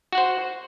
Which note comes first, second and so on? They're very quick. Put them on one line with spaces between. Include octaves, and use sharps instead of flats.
F#4 F#5 C5